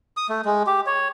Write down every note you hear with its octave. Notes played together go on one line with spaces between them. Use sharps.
D#6
A3
G#3
G4
C#5